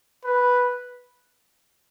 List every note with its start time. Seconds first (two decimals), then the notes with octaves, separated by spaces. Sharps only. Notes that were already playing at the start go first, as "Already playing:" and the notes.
0.25 B4